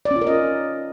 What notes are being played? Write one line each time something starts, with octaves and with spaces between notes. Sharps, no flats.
D5
C#4
F4
A#4
D#5